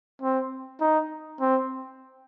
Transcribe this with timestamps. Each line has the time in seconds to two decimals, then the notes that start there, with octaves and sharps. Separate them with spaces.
0.22 C4
0.81 D#4
1.40 C4